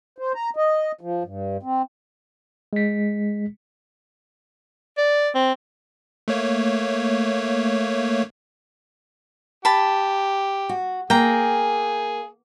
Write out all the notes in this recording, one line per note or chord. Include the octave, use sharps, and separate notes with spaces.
C5
A#5
D#5
F3
G2
C4
G#3 B6
D5
C4
A3 A#3 C#5
G4 A5 B5
F#4
A#3 G#4 G5 A#5